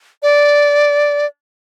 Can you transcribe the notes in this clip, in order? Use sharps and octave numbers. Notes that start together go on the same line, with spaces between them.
D5